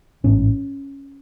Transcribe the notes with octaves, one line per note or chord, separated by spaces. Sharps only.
A1 G#2 C#4